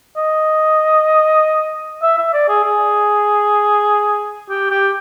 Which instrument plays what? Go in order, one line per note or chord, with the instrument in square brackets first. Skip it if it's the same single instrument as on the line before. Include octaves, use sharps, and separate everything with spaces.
[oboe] D#5
E5
E5
D5
G#4
G#4
G4
G4